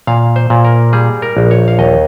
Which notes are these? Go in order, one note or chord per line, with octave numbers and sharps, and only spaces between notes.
A#2 F5
C5
A#2
A#4
G3 G#4
A#4
A#1
C#5
F5
D#2 D#5